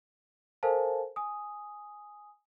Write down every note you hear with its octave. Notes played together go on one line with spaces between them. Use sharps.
A4 A#4 C5 F5 G#5 A5
G#5 D#6